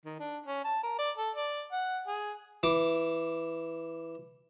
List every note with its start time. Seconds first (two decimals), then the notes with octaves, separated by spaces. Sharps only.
0.06 D#3
0.20 D4
0.46 C#4
0.64 A5
0.83 A#4
0.99 D5
1.17 A4
1.36 D5
1.72 F#5
2.07 G#4
2.63 E3 D6